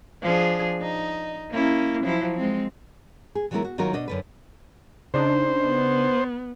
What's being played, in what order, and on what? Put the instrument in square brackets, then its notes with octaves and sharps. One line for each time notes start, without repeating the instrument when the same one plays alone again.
[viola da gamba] F3 D4 G#4
D#4
A#3 C#4 E4
F3 F#3 E4
G#3 C4
[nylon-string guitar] G#4
E3 F#3 G#3 B3 E4 A#4
F#4
D#3 F#3 F4 F#4 A#4
B2 D4 D#5
F#2 D3 B4
[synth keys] C#3 D4 D#4 [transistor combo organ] C5
[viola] B3